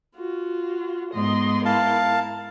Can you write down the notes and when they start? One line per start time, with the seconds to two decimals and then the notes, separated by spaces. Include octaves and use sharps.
0.16 F4 F#4
1.14 G#2 B3 D#5 C6
1.65 E4 A#4 F5 A5